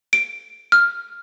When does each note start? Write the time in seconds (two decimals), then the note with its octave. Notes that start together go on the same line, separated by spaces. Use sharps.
0.13 D7
0.72 F6